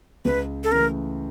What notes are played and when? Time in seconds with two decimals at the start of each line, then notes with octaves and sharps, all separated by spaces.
0.25 C#2 B4
0.64 A4
0.72 C#3 E3 A3 A#4